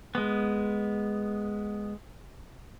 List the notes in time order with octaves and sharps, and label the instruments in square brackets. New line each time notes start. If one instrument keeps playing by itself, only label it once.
[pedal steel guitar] G#3 B3